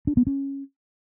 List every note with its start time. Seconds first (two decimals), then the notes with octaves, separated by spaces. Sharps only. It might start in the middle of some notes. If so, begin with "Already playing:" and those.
0.07 D4
0.17 B3
0.27 C#4